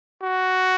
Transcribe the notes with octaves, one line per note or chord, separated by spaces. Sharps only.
F#4